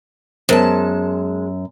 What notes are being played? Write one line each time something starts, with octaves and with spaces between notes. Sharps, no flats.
F#2 G#3 B3 A#4 C5 A5